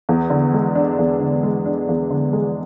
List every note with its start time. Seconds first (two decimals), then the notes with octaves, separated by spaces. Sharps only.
0.09 E2
0.30 D3
0.54 G#3
0.75 D4
0.99 E2
1.20 D3
1.43 G#3
1.66 D4
1.89 E2
2.10 D3
2.33 G#3